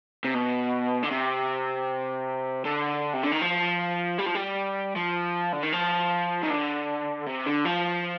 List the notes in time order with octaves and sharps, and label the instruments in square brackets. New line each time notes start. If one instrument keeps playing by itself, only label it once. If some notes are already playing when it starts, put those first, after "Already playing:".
[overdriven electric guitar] C3
B2
D3
C3
D3
C3
D3
D#3
F3
G3
F3
G3
F3
D3
D#3
F3
D#3
D3
C3
D3
F3